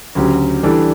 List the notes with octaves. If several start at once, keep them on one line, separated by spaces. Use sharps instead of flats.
D2 C#3 F#3 C#4 G4
E3 G3 D4 A4